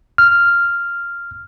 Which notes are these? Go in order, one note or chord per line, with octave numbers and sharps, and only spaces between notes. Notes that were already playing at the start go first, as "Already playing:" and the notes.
F6